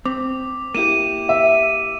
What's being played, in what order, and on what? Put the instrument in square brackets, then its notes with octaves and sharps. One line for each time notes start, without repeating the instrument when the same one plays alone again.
[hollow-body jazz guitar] C4 [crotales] D6
[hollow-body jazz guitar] A#3 E4 G4 [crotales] D#7 E7
[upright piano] E5